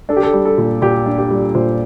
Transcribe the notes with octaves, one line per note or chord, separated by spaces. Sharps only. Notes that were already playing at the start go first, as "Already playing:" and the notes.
D4 A4
G4
A4
G3
A4
A#2
A#2 G4
D4
G4
G3
A#2 C5